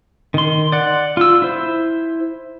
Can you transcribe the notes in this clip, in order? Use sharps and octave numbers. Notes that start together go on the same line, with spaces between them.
D#3 C6
D5 F#5
F4 E6
E4 C5